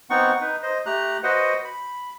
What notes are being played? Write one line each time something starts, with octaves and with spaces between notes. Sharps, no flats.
B3 C4 D#4 F#5 C#6
D#4 B4
C5 D#5
A3 G4 A#5 F#6
F#4 B4 C5 D#5 F#5
B5